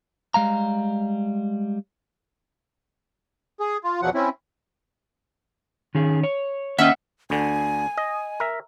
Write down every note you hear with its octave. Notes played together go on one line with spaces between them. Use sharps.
G3 G#3 F5 A#5
G#4
F4
E2 B2 F3 F#3 F#5
C4 C#4 E4
D#3 C#4 G#4
C#5
D#2 C#4 D#5 E5 F#5 E6
D2 D3 G#5
D#5
A#4 E5